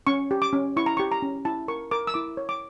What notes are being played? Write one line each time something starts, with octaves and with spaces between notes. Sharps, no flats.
C#4 C#6
G4
D6
C#4
E4 C#6
A#5
G4 C#6
A#5
C#4
E4 A5
A#4 C#6
A#4 D6
E6
E4 D6
C#5
D6